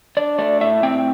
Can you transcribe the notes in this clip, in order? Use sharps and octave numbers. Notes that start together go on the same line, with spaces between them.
D4 D5
A3 D5
A2 E5
C4 G5